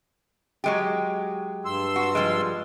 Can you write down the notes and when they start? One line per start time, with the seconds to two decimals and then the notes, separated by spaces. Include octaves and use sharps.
0.64 F#3 G#3 G4
1.65 G2 C6 E6
1.96 F#4
2.15 F3 G3 G#3